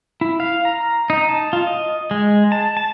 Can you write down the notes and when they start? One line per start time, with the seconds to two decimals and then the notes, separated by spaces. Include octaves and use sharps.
0.21 E4
0.40 F5
0.65 A#5
1.10 D#4
1.29 A5
1.53 F4
1.67 D#5
2.11 G#3
2.52 A5
2.77 A5